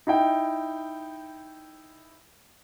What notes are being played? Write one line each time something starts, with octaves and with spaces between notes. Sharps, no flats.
D#4 E4 G5